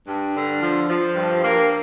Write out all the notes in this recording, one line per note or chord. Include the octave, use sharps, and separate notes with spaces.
G2
D3
F3
F3
G2
A#3